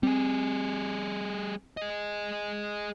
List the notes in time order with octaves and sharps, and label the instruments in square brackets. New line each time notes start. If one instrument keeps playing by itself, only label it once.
[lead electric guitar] G3 G#4 [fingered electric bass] C4
[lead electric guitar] G#4 D#5